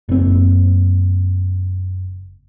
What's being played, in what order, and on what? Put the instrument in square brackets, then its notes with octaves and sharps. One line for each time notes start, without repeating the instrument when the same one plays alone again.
[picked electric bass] F#1 C4